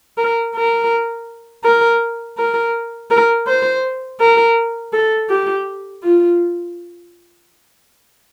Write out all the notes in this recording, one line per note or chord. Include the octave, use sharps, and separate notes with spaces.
A#4
A#4
A#4
A#4
A#4
C5
A#4
A4
G4
F4